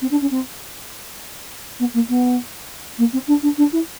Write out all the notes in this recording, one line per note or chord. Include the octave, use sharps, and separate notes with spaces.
C4
D4
C#4
C4
B3
A#3
B3
A#3
C4
D4
D4
D4
E4